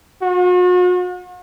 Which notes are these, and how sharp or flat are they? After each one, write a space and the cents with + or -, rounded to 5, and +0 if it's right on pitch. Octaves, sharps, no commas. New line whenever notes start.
F#4 -45